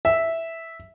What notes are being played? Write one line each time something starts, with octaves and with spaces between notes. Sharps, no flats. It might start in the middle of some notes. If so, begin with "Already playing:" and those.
E5